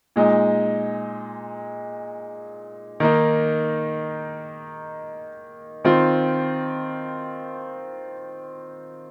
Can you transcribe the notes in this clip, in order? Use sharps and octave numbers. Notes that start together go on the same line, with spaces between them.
A#2 G#3 D#4
D#3 A#3 D#4
D#3 C4 F4